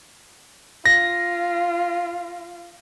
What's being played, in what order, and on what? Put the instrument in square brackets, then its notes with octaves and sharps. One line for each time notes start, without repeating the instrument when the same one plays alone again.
[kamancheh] F4 [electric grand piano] A#6